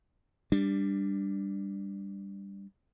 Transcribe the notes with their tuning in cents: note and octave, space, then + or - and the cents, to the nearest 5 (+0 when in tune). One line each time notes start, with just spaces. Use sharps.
G3 +15 D4 +0